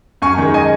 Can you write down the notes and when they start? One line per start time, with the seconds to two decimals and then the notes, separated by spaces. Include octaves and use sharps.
0.22 F#2 G#5 C#6
0.38 D#3 G#3
0.54 D#5 G#5